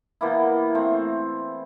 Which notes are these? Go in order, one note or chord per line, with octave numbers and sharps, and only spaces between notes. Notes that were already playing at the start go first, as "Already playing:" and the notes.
B2 E3 A#3 E4
A3 C4